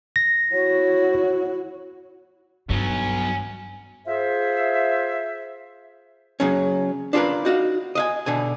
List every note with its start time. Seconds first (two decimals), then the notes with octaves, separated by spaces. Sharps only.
0.16 A#6
0.52 E4 F#4 C#5
2.70 G2 F#3 B3 C#4
4.06 F4 G#4 C5 E5
6.40 C#3 F#3 C#4
7.13 D4 F4 G#4 A#4 B4
7.45 D#4 F#4 F5
7.95 D#5 F5 G#5
8.26 B2 D3 G#5